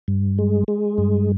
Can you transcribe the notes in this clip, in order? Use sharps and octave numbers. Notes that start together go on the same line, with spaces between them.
G2
G#3
G#3
G2